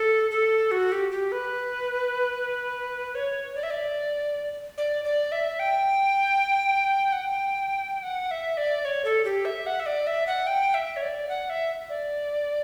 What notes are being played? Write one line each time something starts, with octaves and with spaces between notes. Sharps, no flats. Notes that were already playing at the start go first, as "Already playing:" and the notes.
Already playing: A4
A4
F#4
G4
G4
B4
C#5
D5
E5
D5
D5
D5
E5
G5
F#5
G5
F#5
E5
D5
C#5
A4
G4
E5
F#5
E5
D5
E5
F#5
G5
E5
C#5
D5
F#5
E5
D5